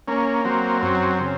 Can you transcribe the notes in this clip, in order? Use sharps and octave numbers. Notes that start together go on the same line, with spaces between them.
A#3 C#4
F#3 C4
F#2 C4
C#3